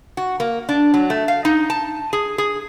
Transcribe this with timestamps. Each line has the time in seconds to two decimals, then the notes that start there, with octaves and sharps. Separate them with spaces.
0.17 F#4
0.40 A#3
0.69 D4
0.94 F#3
1.10 A3
1.28 F5
1.45 D#4
1.70 A5
2.13 G#4
2.38 G#4